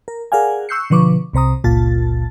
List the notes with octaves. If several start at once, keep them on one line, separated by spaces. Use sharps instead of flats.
A#4
G#4 A#4 D5 F5 F#5 G#5
C#6 E6 F#6 G6 C7 C#7
B2 D3 F3 B4 C#6 D6
C2 C3 C5 A#5 D#6
G1 C#2 A#2 F4 A5 A6